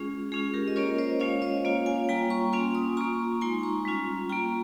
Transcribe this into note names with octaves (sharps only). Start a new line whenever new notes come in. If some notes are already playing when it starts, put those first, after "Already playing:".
Already playing: G#3 C#4 F4 G#4
G#3 C#4 F4 G#4
G4 A#4
D#5
A#3 C#4 F4 A#4 C#5
C5 D#5
G#3 C#4 F4 C#5 F5
C5 D#5
A#3 C#4 F4 C#5 F5
F5 G#5
G3 A#3 F4 G5 A#5
A#5 C#6
A#3 C#4 F4 G#5 C6
C6 D#6
A#3 F4 A#5 C#6
G#3 D#4 G#5 C6
A#5 C#6
G3 C#4 F4
A#3 F4 G5 A#5